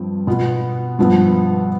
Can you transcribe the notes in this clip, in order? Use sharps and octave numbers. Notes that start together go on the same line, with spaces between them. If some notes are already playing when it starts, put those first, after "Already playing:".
Already playing: G2 F3 C4
B2 B3 F4
G2 F3 B3